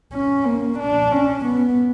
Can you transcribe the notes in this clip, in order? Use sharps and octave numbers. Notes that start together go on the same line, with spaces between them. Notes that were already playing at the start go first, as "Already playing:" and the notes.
C#4
A#3
D4
C#4
B3